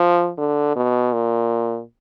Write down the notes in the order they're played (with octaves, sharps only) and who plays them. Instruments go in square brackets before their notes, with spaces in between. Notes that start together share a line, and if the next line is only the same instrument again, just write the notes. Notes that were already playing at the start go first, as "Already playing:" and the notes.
Already playing: [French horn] F3
D3
B2
A#2